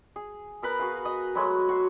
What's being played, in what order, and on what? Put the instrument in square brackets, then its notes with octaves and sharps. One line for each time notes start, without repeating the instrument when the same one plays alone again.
[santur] G#4
B3 A#4 B4 B5
F#4 G#4 F5
D#5 C#6
F#3 G#3 A3 B5
F#4 C6